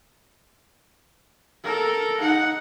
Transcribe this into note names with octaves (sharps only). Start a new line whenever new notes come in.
A4 A#4
D#4 F#5